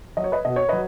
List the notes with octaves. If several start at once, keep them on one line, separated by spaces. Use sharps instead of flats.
F#3 D#5
C#5
B4 D#5
B2 D#5
C#5
F#3 B4 D#5